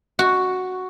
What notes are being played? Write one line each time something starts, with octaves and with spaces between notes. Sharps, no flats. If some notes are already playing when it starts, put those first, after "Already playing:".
F#4